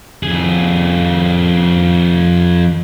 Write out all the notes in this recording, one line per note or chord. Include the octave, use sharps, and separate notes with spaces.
F2 G#4